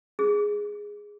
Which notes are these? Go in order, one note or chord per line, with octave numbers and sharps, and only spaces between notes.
G#4